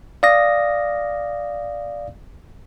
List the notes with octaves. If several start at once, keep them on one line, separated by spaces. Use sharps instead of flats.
D5 F5 D#6 A#6